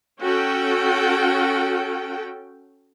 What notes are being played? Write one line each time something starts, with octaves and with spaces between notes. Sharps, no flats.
C#4 F#4 A4 G5